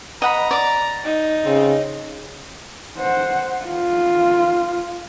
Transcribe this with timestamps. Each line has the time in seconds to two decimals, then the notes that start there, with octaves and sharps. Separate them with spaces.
0.22 D#5 F#5 A#5 B5
0.51 D5 D6
1.05 D#4
1.45 C#3 C4
2.98 C5 F#5
3.65 F4